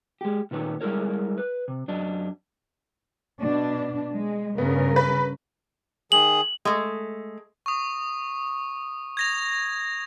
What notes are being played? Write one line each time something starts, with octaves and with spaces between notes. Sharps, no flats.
G#3 G4
A#2 D#3 B4 C#5
G3 G#3 E4 A4 A#4 C#5
B4
C3
F#2 D4 D#5
B2 D4
G#3
G2 C#3 B3 A#4
B4
D#3 G#4 F#7
G#3 A3
C#6 D#6
G#6 A#6 F7